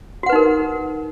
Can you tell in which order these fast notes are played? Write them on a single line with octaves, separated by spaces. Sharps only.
F#4 F#5 B4 D#4 A#4